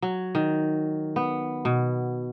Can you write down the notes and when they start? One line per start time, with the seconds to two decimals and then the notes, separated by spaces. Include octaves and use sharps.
0.02 F#3
0.35 D#3
1.16 B3
1.65 B2